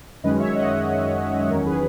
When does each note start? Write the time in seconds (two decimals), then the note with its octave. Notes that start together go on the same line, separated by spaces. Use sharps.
0.24 F#2 D#3 G#3 C#4 B4 D#5
0.40 C#5 E5
0.55 D#5 F#5
1.50 E2 D#3 F#3 C#4 A#4 C#5
1.65 G#4 B4